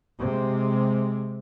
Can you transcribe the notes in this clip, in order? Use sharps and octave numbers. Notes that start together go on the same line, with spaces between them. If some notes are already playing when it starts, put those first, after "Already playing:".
C3 G#3